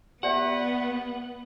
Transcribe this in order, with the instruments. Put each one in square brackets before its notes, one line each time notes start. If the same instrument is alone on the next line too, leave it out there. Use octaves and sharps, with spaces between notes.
[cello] B3 [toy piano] G4 D5 E5 [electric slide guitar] F#5